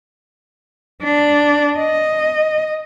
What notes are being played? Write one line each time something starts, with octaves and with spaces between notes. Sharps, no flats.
D4
D#5